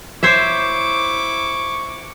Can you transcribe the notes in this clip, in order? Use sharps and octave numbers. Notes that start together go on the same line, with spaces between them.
E4 C5 C#5 E5 C#6 D6